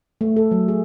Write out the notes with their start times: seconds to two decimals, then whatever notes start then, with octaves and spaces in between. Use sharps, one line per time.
0.21 A3
0.36 A4
0.51 F#3
0.68 G#4